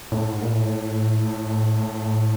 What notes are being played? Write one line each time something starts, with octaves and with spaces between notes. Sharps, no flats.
A2
G#2
A#2
A2